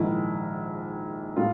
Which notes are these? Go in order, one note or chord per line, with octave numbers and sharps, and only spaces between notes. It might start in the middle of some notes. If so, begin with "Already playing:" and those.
Already playing: A#1 G#2 D#3 E4
A2 F4